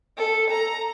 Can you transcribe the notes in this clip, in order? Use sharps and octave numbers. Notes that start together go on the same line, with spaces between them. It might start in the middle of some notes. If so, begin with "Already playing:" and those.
A4
A#5